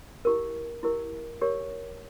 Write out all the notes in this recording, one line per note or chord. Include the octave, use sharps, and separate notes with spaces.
E4 G4 A#4
E4 G4 A#4
G4 A#4 C#5